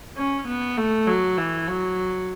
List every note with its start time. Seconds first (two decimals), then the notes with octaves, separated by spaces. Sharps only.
0.17 C#4
0.48 B3
0.78 A3
1.07 F#3
1.38 E3
1.68 F#3